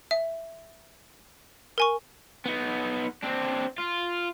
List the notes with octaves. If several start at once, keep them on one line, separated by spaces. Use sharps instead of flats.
E5
A#4 G#5 C#6
B3 D#4
C4 D4
F4